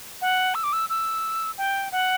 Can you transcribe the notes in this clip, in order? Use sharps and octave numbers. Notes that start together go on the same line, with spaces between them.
F#5
E6
D6
E6
E6
G5
F#5